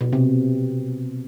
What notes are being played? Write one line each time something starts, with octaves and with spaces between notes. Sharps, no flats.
B2
C3